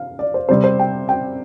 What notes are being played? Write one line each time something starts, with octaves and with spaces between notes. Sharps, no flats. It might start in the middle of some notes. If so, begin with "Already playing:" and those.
Already playing: F5
D5
C5
C3 G3 C4 C5
C5
G5
G5